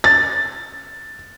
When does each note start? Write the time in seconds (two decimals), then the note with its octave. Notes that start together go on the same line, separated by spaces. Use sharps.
0.04 A6